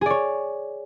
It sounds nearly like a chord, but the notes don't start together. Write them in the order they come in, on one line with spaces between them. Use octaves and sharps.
G#4 D5 C#5